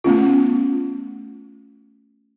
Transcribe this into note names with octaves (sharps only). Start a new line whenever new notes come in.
A3 B3 C#4 F4